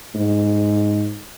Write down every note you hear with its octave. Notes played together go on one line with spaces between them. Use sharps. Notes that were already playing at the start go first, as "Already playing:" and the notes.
G#2